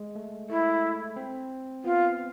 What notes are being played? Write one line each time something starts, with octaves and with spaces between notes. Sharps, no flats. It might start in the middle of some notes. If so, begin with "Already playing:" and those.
Already playing: G#3
A3
A3 E4
C4
B3 F4